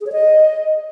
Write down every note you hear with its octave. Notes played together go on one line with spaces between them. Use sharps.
G#4
C#5
D#5